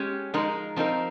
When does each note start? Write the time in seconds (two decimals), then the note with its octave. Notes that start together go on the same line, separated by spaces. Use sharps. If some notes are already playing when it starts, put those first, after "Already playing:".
Already playing: G#3 C#4 G4
0.34 F3 G#3 D#4 A#4
0.76 F3 C4 D#4 A#4